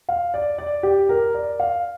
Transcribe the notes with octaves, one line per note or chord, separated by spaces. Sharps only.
F5
D5
D5
G4
A#4
D5
F5